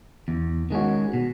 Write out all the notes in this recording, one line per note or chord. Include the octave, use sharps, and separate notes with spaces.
E2
D#3 G#3 C#4 F#4
B2